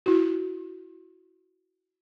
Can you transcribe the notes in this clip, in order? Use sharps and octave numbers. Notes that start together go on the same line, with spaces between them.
E4 F#4